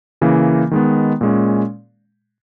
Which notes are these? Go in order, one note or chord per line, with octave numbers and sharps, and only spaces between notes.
C#3 E3 A#3
D#3 G#3 B3
A#2 G#3 C#4